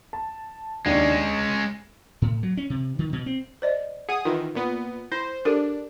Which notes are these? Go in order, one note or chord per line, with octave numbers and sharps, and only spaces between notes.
A5
D#2 G#3 C#4 D4
E7
A2
F#3
C#4
C3
D#3
B2
C4
C5 D5 D#5
G#4 F#5 D#6
D#3 E3 F4
A#2 B3
E4 C5
D4 G4 A4 A#4